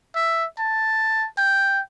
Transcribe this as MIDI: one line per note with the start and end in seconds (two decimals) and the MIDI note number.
0.16 0.45 76
0.59 1.27 81
1.38 1.80 79